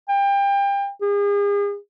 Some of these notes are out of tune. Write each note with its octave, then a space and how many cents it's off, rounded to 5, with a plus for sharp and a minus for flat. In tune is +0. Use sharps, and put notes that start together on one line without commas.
G5 +30
G#4 -40